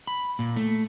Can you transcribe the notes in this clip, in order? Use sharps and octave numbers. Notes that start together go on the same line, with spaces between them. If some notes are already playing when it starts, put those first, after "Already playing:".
B5
A#2
A3